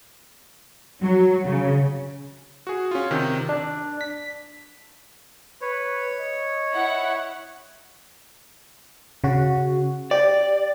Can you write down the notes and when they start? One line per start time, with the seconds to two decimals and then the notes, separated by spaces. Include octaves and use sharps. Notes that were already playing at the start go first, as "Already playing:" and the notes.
1.02 F#3
1.45 C#3
2.67 F#4 G#4
2.91 C#4 F4
3.11 C3 D#3
3.49 D4
4.01 B6
5.61 B4 C#5
6.20 D#5
6.71 E4 F#5
9.24 C#3 F#4
10.11 G4 D5